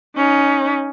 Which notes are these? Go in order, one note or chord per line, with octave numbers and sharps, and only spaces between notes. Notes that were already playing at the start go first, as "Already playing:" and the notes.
C#4 D#4